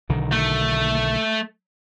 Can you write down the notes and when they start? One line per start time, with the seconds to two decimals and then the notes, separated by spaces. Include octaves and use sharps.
0.09 B1 D3 D#3
0.32 A3